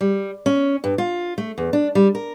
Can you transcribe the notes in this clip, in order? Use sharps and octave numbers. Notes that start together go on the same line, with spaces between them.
G3
C#4
G2
F4
A3
E2
D4
G3
A#4